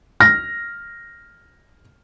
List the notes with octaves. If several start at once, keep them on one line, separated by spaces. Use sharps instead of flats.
F6 A#6